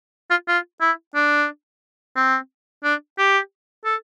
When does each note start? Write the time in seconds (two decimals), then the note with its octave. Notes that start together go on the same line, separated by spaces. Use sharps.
0.30 F4
0.48 F4
0.81 E4
1.15 D4
2.16 C4
2.84 D4
3.18 G4
3.85 A4